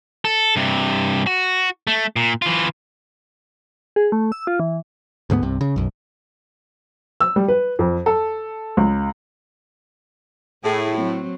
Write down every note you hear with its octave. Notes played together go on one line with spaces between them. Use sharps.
A4
G2 C3
F#4
A3
A#2
E3 F4
G#4
A3
E6
F4
E3
D2 G#2 G3 B3
C2 G2 C3
C#3
B1 F#2
E6
G3
B4
F2
A4
C#2
A2 A3 G#4
F#3 C4